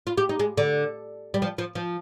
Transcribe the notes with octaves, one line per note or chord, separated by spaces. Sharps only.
F4
G4
D#4
G#3
D3
G3
F3
F3
F3